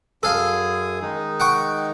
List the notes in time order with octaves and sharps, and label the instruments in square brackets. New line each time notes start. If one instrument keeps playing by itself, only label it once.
[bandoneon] F#2 G#4 D#6 [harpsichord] A4 F5
[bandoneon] D#3 G#3 D#4
[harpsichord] F#5 G5 C#6